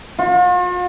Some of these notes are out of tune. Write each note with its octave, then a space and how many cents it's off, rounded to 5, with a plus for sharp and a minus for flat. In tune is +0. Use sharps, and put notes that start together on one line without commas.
F4 +45